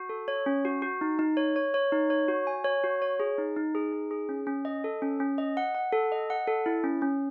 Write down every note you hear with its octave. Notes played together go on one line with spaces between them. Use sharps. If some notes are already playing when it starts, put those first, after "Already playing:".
Already playing: F#4
A4
C#5
C#4
F#4
F#4
D#4
D#4
C#5
C#5
C#5
D#4
C#5
F#4
G#5
C#5
F#4
C#5
G#4
D#4
D#4
G#4
D#4
G#4
C#4
C#4
D#5
A4
C#4
C#4
D#5
F#5
F#5
A4
D#5
F#5
A4
E4
C#4
C#4